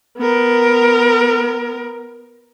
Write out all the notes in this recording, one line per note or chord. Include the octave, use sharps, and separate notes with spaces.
B3 A#4